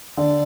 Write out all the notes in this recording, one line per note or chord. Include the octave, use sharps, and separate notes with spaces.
D3 D5